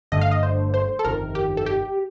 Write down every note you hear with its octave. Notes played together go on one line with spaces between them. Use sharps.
G1 G2 D3 A3 D#5
F5
D#5
C5
C5
A4
G1 F2 C3 D#3 A#4
G4
A4
G4